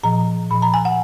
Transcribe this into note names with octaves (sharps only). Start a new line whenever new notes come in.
A#2 F3 A#5
A#2 F3 B5
A#5
G#5
F#5